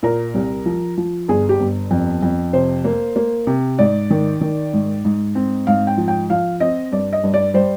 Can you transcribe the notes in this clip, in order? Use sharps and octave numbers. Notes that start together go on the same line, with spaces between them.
A#2 A#4
C2
F3
F3
G1 G#4
G4
G1
F2
F2
C3 C5
A#3
A#3
C3
G#2 D5
D#3
D#3
G#2
G#2
C4
G#2 F5
G5
F3
G5
F3 F5
C4 D#5
G2 D5
D#5
G2
D5
G3 C5